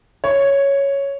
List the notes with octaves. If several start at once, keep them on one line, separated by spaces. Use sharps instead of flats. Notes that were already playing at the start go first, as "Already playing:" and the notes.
C#5